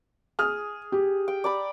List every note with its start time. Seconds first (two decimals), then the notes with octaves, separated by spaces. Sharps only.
0.39 G#4 F6
0.92 G4
1.28 G5
1.44 D5 A#5 B5